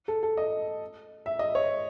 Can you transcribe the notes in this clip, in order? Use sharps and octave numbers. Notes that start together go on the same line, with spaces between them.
A4
A4
D#5
E5
D#5
C#5